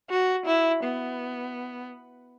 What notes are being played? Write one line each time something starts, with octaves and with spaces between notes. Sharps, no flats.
F#4
E4
B3